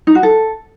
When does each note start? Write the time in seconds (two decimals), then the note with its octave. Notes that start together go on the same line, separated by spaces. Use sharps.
0.07 D#4
0.15 F#4
0.23 A4